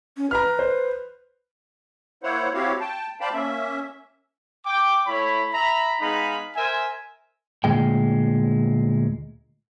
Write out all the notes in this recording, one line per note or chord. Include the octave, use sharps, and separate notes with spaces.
C#4
B4 A#5 B5 F6
C5
A#3 E4 C5 C#5 F#5
C4 E4 F#4 G4 C#5 F5
G5 A5
C5 D5 F5 G5 A5 B5
A#3 C#4 E5
G5 D6
A3 E4 C#5 B5
E5 A#5 B5
G#3 B3 D#4 G#4 F5 B5
A#4 C5 E5 G#5
D2 A#2 G#3 G5